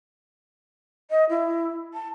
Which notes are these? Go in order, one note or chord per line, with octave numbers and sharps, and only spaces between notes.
D#5
E4
A5